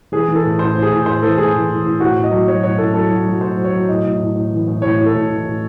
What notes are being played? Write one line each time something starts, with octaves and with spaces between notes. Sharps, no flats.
E3 G#4
E3
A4
A2
A2 C5
A2
G#4
A2
A2 C5
E3 A4
A2 G#4
E3
E3
A2
A2 F#4
A2
D#5
F#3
F#3 C#5
A2 C#5
A2 A4
F#3 A4
F#3
F#3
A2 C5
F#3
C#5
F#3
A2 D#5
A2
A2
A2
E3
A2
A2 C#5
A2
A4
A2
E3
A2